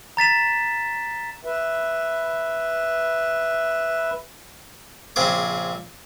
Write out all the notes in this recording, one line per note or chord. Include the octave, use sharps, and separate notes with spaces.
A#5 A6 B6 E7
B4 E5
A#1 C#3 C4 G#4 D6